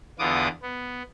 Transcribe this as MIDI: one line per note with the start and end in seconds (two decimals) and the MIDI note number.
0.19 0.48 40
0.19 0.48 50
0.19 0.48 59
0.19 0.48 65
0.19 0.48 86
0.19 0.48 87
0.62 1.02 59